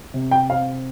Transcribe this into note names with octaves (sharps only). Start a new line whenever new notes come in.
C3
G5
C4 F5